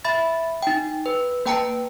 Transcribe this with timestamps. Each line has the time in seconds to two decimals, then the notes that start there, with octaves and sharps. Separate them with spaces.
0.05 E5 B5 A6
0.63 D#4 G5
1.06 B4
1.46 A#3 B4 G5 A5 A#5 C#7